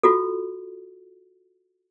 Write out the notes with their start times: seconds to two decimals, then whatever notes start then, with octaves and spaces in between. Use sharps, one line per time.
0.03 F4 F#4 A4